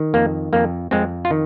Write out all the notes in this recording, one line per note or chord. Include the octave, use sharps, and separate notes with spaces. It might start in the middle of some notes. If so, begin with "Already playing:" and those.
Already playing: D#3
F2 A#3
F2 A#3
F2 G#3 C4
F4
D#3